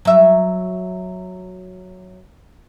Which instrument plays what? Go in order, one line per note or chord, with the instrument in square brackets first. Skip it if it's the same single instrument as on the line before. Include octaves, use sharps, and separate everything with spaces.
[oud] F#3 E5